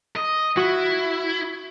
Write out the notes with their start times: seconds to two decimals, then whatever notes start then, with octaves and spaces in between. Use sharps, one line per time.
0.16 D#5
0.57 E4 F#4